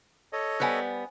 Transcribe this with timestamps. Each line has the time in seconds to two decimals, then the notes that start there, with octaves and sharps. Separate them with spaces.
0.33 A4 C#5 D#5
0.60 G3 B3 C5 G#5